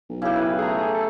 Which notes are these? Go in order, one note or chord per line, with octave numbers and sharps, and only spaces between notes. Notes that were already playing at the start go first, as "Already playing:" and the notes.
B1
C#3 E4 G4
B4
A3 G#4 A#5
A4